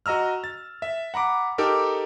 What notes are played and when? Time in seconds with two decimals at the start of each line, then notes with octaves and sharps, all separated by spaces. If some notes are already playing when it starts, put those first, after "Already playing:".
0.06 F#4 D#5 A#5 E6 F6
0.44 A6
0.82 E5
1.14 F#5 A#5 B5 D6
1.58 D#4 G4 A4 A#4 D6